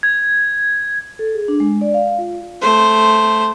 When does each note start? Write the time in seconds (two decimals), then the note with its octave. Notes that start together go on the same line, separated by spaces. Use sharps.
0.03 G#6
1.19 A4
1.35 G#4
1.48 D4
1.60 G#3
1.81 D5
1.94 F5
2.18 F4
2.62 A3 C5